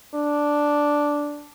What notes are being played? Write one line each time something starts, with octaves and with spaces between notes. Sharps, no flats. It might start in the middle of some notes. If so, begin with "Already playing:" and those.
D4